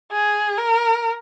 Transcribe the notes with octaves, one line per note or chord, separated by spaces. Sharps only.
G#4
A#4